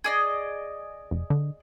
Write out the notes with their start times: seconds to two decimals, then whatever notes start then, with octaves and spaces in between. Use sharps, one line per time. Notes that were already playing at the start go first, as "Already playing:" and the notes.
0.04 G#4 D5 D#5
1.11 F1
1.30 D3